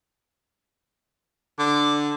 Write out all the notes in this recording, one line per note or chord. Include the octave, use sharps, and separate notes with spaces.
D3 D5